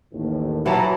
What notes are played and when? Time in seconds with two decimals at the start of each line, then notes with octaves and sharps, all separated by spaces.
0.12 A1 D#2 A2
0.66 E3 F#3 F#5 A5 A#5